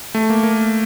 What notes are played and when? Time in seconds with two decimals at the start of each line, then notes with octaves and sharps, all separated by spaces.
0.15 A3
0.30 A#3
0.43 A#3